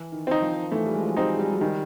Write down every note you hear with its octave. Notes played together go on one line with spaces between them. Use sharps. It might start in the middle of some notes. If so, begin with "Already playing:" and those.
Already playing: E3
D#3
C4 D#4
F3
E3 A3
G3
G#3
F3
F#3
G3 C4 D#4
G#3
G3
F#3
D#3 G3